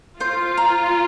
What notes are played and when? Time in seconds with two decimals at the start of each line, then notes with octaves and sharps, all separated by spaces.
0.20 F4 C5
0.57 A#5